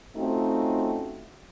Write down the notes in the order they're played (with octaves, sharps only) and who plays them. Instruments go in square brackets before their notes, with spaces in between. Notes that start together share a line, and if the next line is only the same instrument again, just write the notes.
[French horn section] A3 C4 C#4 D#4 F4 F#4